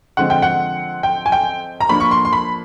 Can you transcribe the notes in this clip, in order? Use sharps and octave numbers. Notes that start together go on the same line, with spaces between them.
D3 F3 G#3 C4 F#5
G5
F#5
G5
G#5
G5
A#5
F3 A#3 D4 B5
C#6
C6
C6
B5